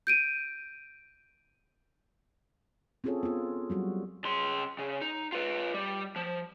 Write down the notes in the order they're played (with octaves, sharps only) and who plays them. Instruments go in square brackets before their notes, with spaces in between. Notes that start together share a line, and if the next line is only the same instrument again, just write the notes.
[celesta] G6 D7 D#7
[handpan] C4 C#4 F4 G#4 A4 C#5
B3 F4
F#3 G3 F#4
[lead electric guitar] C#3 C6
C#3
D#4
F4 B4
G3
F3